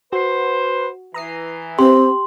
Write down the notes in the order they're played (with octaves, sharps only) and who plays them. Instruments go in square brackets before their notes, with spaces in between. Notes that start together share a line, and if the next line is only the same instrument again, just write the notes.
[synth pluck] F#4 [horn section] B4 C5
[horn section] E3 [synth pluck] A#5 D#6 C7
[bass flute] C4 [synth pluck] G4 [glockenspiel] C6